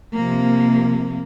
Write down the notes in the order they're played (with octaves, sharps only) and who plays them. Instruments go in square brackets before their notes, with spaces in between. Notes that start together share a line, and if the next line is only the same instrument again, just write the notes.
[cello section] C3 F3 A#3